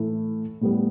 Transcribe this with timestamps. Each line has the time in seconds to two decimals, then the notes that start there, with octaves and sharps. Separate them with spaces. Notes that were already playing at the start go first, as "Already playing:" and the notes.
Already playing: A2 E3 A3 E4
0.61 A2 G3 B3